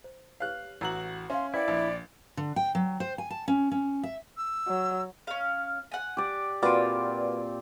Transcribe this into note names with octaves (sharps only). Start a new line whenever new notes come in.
C5
G4 B4 C#5 F5 F#6
A1 F#4 B4 A#5 E6 F#7
C#4 E5 F5 C6
E4 B4 C5 D5 G5
A#1
D3
G5
F#3
C5
G#5
A5
C#4
C#4
E5
E6
F#3
C#4 F5
F#5 G#5
G4 D5
A#2 A#3 C4 F4 F#4 B4 D5